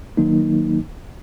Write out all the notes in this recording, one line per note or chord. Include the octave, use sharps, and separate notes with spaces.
D#3 F#3 A#3 D#4